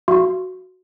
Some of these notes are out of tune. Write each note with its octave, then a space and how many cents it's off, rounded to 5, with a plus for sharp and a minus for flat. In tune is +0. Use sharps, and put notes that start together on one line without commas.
F#4 +0 F5 -40 C6 +0